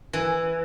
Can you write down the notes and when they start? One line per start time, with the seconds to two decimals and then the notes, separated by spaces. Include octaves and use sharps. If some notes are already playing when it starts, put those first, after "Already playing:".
0.13 E3